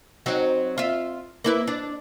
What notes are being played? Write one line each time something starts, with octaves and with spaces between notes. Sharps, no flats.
F#3 C4 D#4
F4 E5
A#3 E4 B4
D4